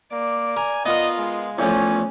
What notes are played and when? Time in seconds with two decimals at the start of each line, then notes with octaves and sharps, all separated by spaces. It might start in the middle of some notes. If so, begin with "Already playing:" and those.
0.12 A#3 D5
0.56 A#4 G#5
0.85 B3 F4 A#4 D#5
1.18 G#3
1.58 E2 A2 F3 C#4